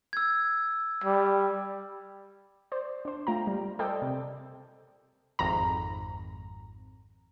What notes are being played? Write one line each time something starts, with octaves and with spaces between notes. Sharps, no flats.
E6 G#6
G3
C5 D5
D4 C5
A3 F4 G5 A#5
G3
A4 A#4 C5 D5 D#5 G5
C3
G#1 F2 A#5